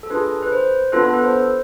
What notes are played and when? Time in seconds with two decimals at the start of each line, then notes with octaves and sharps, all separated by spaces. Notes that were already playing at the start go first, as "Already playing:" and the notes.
0.03 A4
0.10 D4 F4 G#4 B4
0.42 B4
0.52 C5
0.92 B3 D4 F4 A4 B4
1.04 A4
1.14 B4
1.23 C5